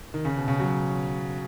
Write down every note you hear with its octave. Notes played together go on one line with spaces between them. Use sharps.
D#3
C#3
B2
C#3
F#3